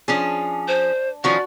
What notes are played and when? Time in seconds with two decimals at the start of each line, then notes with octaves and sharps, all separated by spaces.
0.08 F3 C#4 D4 G#4
0.68 C5
1.24 D#3 F3 C#4 F#4 D5